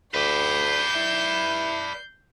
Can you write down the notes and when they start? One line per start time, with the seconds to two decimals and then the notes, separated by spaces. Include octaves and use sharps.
0.14 D2 B4 D5 G6 C7
0.95 E4